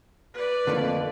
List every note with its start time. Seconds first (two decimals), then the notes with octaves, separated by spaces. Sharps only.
0.34 B4 D5
0.67 F2 D3 A3 A#3